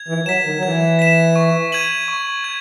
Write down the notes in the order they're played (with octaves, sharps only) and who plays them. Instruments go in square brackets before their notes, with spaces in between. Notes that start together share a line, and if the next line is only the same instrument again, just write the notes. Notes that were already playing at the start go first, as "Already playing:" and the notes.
Already playing: [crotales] G#6
[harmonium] E3
[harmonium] F#3 [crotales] B6 E7
[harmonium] D#3
F#3
[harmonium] E3 [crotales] G#6
[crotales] B6 E7
C#6
G#6 D#7 F#7
C#6
G#6